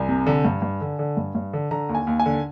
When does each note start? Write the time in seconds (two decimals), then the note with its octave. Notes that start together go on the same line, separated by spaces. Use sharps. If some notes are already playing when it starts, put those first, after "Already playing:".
Already playing: C2 G#5
0.09 C3
0.27 D3
0.45 G2
0.62 G2
0.81 D3
0.99 D3
1.17 G2
1.35 G2
1.53 D3
1.71 D3 A#5
1.89 D#2
1.95 G#5
2.07 D#2
2.20 G#5
2.26 D3